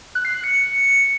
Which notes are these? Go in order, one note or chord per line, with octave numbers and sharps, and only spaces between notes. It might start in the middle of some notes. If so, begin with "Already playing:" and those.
F#6
C7
F#6
C#7